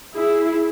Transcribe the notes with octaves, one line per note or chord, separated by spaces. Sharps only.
E4 G#4